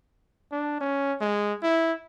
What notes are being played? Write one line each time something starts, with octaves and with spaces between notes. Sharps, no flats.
D4
C#4
G#3
E4